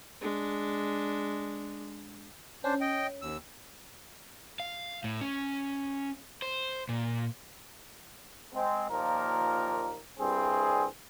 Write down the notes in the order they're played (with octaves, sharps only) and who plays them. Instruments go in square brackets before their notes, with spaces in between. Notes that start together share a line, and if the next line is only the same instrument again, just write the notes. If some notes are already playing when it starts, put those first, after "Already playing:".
[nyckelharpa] G#3 D4
[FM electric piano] C#4 [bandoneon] D4 C5
[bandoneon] D#5 G5
D#2 E6
[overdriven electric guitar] F5
A2
C#4
C5
A#2
[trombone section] G#3 C4
D#2 A#2 F3 A#3 A#4
C2 G2 C4 G#4